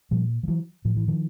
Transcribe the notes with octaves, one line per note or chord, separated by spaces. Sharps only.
A#2 F3 G3
F3
E3 F#3
A2 F3
E3
D#3 F3